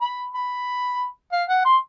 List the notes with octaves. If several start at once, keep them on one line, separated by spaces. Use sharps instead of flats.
B5
B5
F5
F#5
C6